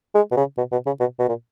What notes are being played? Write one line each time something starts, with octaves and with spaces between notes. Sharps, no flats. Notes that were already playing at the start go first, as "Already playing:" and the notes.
G#3
B2
C#3
B2
B2
C#3
B2
B2
A#2